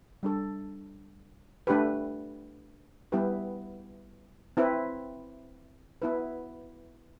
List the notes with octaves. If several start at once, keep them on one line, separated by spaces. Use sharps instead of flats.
G3 D4 A4
A3 D4 G4 B4
G3 B3 E4 G4 B4
C4 E4 B4
B3 E4 B4